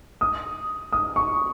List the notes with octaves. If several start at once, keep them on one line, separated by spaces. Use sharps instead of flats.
D#6
D#6
C#6